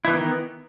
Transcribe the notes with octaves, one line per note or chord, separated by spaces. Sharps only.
D#3 E3 B3 E4